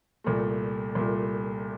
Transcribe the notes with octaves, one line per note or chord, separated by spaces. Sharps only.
C2 A#2 A3
C2 A#2 A3